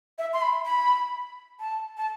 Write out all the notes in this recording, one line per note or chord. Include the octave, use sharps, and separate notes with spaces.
E5
C6
B5
B5
A5
A5